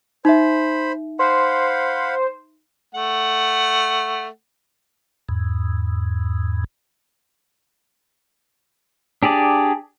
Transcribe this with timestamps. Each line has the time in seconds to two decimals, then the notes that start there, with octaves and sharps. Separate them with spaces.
0.25 D#4 C5 E5 B5
1.19 C5 F5 F#5 B5
2.95 A3 F#5
5.29 E2 G#2
9.23 D4 G4 G#4 D5